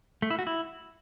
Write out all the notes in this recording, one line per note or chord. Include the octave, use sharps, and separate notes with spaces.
A3
E4
F#4
E4